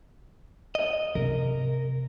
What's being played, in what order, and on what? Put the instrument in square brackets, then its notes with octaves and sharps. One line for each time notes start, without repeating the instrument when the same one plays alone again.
[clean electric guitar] D#5
[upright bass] C3 [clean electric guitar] A#4